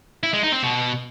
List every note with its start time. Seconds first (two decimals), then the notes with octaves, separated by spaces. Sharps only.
0.23 E4
0.33 G#3
0.43 D#4
0.53 C4
0.63 B2